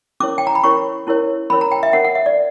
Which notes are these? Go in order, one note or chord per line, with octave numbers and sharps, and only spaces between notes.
C#4 E4 A#4 C#5 D6
G5
A#5
B5
C#4 E4 A#4 C#5 C#6
C#4 E4 A#4 C#5
C#4 E4 A#4 C#5 B5
A#5
G5
E5
D4 A#4 C#5 F#5
F#5
E5
D5